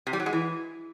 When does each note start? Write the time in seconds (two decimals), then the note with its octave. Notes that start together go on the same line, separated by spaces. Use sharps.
0.07 C3
0.13 G3
0.20 F#3
0.26 G#3
0.33 E3